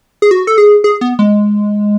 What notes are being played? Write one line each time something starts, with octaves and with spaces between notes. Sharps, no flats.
G#4
F#4
A4
G#4
G#4
B3
G#3